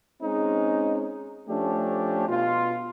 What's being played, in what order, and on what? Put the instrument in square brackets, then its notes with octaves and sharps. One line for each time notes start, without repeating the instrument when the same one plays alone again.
[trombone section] G#3 C4 C#4 D#4
F3 A3 C#4 D4 G4
B2 F4